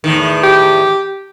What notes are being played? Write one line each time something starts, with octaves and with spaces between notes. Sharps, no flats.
E2 A2 D#3
G4